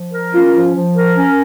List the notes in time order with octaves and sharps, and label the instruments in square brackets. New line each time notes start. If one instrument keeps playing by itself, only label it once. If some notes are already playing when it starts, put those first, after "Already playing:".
Already playing: [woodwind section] F3
A#4
[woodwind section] C#4 [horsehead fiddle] F4
[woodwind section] F3
F3
A#4
C#4